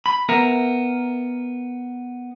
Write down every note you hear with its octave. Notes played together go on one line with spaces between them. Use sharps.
B5
B3 A#4 E5